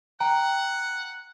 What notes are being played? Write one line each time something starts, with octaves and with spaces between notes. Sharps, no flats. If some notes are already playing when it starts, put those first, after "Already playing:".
F#5 G5 A#5